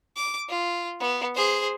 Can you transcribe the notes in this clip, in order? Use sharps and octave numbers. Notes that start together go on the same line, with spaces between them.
D6
F4
B3
G#4 C5